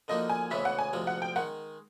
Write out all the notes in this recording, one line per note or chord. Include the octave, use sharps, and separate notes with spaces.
D3 F3 A#3 D#4 F#4 D#5
G#5
D2 C#3 E3 G#3 B3 E5
F#5
G#5
D2 C3 F3 G#3
F#5
G5
D#3 G#3 F#5